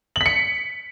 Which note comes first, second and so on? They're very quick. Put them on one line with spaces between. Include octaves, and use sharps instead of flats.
F#7 B6 C#7